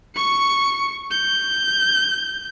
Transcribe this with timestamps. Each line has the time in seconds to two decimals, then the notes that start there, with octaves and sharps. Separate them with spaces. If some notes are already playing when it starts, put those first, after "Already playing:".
0.15 C#6 C#7
1.11 G6